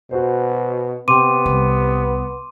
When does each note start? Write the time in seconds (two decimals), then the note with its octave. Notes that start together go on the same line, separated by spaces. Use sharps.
0.11 B2 F#4 C5
1.08 C3 B3 G5 C6 D6 D#7
1.46 C2